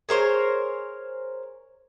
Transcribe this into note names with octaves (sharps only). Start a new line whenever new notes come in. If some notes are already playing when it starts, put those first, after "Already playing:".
G#4 A#4 C5 C#5